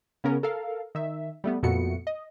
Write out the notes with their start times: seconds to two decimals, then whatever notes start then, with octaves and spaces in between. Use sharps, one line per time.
0.24 C#3 B3 C#4 A#4
0.43 A4 A#4 F5
0.95 D#3 E5
1.44 G3 A3 B3
1.63 F2 A#2 A3 B3 F#4 C#7
2.07 D#5